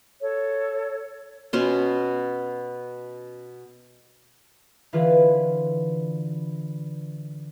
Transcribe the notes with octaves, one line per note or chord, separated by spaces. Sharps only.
A4 C#5
B2 C#4 C6
D3 E3 B3 F4 G#4 B4